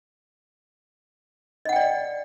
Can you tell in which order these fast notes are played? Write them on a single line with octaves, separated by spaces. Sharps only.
D#5 F#5 G5 D5